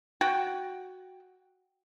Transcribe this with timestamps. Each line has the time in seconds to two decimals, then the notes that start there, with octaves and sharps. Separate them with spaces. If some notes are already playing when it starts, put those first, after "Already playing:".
0.21 F#4 F#5 G5